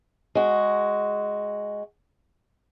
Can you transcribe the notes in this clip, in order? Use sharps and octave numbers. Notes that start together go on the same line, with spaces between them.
G#3 F#4